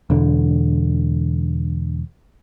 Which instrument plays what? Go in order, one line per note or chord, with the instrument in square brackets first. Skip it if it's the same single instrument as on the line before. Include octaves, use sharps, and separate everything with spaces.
[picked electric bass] E1 D3